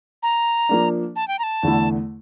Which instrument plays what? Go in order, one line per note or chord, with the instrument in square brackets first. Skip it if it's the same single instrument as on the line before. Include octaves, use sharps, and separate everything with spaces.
[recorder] A#5
[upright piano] F3 A#3 D4
[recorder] A5
G5
A#5
A5
[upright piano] E2 D3 A3 E4